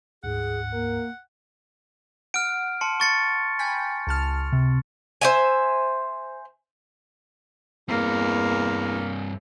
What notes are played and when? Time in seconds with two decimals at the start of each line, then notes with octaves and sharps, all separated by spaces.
0.24 D2 G#2 G#4 F#5
0.73 A#3 A#4
2.34 F#5 F6 D7
2.81 A5 C6 C#7
3.00 C#6 A6 C#7
3.59 G5 G#5 B5
4.07 C#2 A5 F6
4.52 C3
5.21 C5 E5 G#5
7.89 E2 G2 A#3 C4